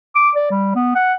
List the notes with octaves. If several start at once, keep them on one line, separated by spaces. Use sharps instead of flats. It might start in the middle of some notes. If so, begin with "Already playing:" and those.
D6
D5
G3
B3
F#5